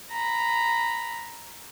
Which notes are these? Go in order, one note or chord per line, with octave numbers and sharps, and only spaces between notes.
A#5 B5